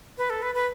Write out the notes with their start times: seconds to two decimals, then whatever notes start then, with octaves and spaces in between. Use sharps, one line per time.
0.18 B4
0.30 A4
0.42 B4
0.55 B4